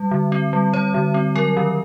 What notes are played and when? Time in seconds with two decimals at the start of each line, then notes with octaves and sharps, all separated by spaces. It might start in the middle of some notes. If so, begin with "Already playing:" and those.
Already playing: G3
0.11 D3
0.32 C4
0.53 G3
0.73 G3 C#5
0.94 D3
1.14 C4
1.35 F#3 A#4
1.57 D#3